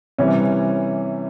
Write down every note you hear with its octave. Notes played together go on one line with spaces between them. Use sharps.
C3 E3 G3 C#4